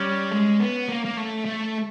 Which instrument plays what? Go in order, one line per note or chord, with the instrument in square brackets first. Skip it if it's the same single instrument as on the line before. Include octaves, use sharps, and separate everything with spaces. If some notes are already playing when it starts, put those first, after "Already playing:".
Already playing: [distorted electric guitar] G3 [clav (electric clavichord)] C#4
[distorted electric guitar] G#3
B3
A#3
A#3
A3
A3